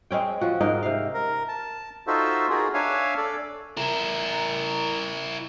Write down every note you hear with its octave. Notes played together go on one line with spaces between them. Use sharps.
G#3 C4 C#4 G5
F3 F#4
G#2 D#4 A#4
C3 F5
A#4
A5
D#4 F4 F#4 A4 C5 E5
D#4 F4 F#4 G#4 A#4
D4 C#5 E5 F5 G#5
A4 D5
E4 A#4